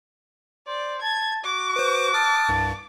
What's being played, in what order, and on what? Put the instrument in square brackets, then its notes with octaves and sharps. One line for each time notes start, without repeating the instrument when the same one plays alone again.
[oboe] C5 [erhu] D5
[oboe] A5 [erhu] G#6
[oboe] F#4 [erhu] D6
[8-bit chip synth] B4 C5
[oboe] A5 [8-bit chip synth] D#6 F6 F#6
[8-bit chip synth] C2 G2